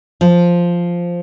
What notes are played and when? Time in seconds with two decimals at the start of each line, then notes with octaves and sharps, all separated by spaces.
0.21 F3